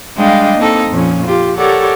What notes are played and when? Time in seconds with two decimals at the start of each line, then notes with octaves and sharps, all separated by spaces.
0.17 G3 G#3 D4 D#5 F5 G5
0.56 A#3 C4 D#4 A4
0.90 F2 A#2 C#4
1.26 F4 G4
1.58 G4 A4 A#4 C#5 D5 F#5